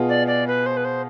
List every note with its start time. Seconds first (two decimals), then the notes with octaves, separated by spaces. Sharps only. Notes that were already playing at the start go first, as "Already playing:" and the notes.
Already playing: B2 B3 F4 G#4
0.09 D5
0.27 D5
0.47 B4
0.66 C5
0.77 B4
0.85 C5